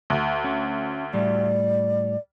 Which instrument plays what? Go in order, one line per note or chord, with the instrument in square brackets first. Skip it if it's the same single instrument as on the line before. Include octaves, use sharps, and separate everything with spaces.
[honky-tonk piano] D2
[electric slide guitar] C#4
[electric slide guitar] A2 G3 [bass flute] D5